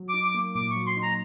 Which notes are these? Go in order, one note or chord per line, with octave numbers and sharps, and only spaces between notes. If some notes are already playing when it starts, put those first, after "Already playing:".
Already playing: F#3
D#4 D6
D6
A#3
A#2 D6
C#6
F#3
C6
D#4
A#5